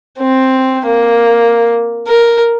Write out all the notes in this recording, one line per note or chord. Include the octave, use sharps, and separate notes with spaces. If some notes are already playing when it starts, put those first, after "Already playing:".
C4
A#3
A#4